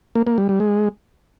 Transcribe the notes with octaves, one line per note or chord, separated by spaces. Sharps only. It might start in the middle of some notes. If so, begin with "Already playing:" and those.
A#3
A#3
G3
G3
G#3